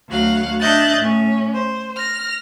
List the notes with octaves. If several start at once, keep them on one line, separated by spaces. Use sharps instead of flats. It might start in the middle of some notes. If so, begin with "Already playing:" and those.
D2 F#3 F5 F#5
D4 D#5 E5 F#6 G6 A6
A2 C#4
C5
F6 A#6